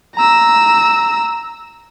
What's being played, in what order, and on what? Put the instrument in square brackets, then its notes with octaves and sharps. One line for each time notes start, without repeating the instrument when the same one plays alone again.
[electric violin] A#5 E6